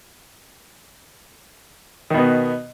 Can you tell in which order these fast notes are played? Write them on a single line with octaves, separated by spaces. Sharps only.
D#3 B2 B3